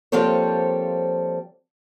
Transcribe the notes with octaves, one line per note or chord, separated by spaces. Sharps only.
F3 G3 A#3 C4 A4 C#5